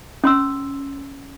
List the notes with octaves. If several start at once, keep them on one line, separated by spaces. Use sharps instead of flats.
C#4 C6 E6